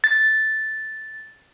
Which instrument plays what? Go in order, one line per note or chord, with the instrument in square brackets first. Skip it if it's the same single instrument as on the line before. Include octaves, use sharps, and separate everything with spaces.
[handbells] A6